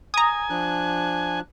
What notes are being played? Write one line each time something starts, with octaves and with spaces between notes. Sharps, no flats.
G#5 A#5 D#6
F3 D4 F#6